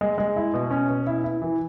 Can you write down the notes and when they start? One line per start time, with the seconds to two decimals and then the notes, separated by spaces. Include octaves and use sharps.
0.01 G#3
0.18 G#3
0.36 E4
0.53 B2
0.71 C#4
0.89 B2
1.07 E4
1.24 E4
1.42 E3